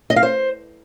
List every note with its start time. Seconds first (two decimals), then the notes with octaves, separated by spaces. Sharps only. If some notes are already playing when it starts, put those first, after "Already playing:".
0.10 D#5
0.16 F5
0.23 C5